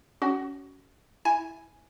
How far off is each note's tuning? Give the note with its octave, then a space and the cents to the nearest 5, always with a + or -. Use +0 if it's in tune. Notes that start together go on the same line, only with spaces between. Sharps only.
C#4 +20 F#4 +25
E4 +0 G#5 +0